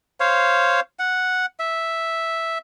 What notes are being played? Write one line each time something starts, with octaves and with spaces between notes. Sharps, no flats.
C5 C#5 F5
F#5
E5